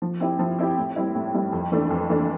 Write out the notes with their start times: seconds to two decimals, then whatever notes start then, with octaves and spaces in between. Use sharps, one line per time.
0.02 F3
0.20 C4 E4 G4
0.39 F3
0.58 C4 E4 G4
0.78 A2
0.96 G3 C4 E4
1.15 A2
1.34 G3 C4 E4
1.53 F2
1.72 E3 A3 D4
1.91 F2
2.10 E3 A3 D4